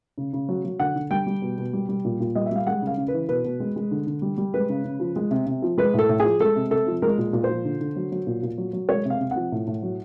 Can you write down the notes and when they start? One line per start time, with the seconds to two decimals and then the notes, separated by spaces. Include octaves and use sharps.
0.18 C#3
0.33 C#3
0.49 F#3
0.64 F#3
0.80 D3 F#5
0.95 D3
1.11 G3 G5
1.27 G3
1.42 B2
1.58 B2
1.73 G3
1.89 G3
2.05 A#2
2.20 A#2
2.35 G3 D#5
2.46 E5
2.51 G3 F5
2.67 G#3 F#5
2.82 C#3 F5
2.97 C#3
3.08 B4
3.13 E3
3.29 B2 B4
3.45 B2
3.60 G#3
3.76 G#3
3.91 D3
4.07 D3
4.22 G3
4.38 G3
4.54 G#3 B4
4.69 C#3
4.85 C#3
5.00 F3
5.16 G#3
5.31 C3
5.47 C3
5.62 F3
5.78 G#3 B4
5.94 A2 A4
6.09 A2
6.20 F3 G#4
6.40 G#3 A4
6.56 C3
6.71 C3 A4
6.87 F3
7.02 G#3 A#4
7.18 A#2
7.33 A#2
7.44 C5
7.49 F3
7.65 D3
7.80 D3
7.96 F#3
8.12 F#3
8.27 A#2
8.43 A#2
8.58 F#3
8.73 F#3
8.89 G#3 C#5
9.05 C3
9.10 F5
9.20 C3
9.31 F3 F#5
9.52 A2
9.67 A2
9.83 F#3